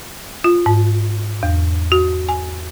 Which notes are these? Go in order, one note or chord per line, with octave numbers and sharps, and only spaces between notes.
F4
G#2
E2
F#4
G#5